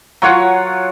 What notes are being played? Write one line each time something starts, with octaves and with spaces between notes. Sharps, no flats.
F#3 F4 C#5 F#5